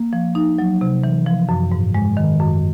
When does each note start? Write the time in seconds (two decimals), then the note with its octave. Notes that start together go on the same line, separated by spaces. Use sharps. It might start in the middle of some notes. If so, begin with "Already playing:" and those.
Already playing: A#3
0.13 F3
0.35 D#4
0.59 F#3
0.81 C3
1.04 E3
1.27 F3
1.49 F#2
1.72 G#2
1.94 G#3
2.17 D#3
2.40 F#2